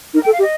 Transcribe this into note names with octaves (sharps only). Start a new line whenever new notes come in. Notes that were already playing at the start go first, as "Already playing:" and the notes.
D#4 A#4
G5
A4
F5
G4
D#5